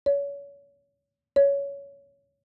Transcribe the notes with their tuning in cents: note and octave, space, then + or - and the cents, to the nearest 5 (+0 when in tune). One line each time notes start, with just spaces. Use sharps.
C#5 +30
C#5 +15